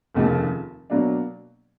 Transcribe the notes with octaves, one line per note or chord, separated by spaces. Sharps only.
F1 D#2 C#3 F3
B2 F#3 A#3 D4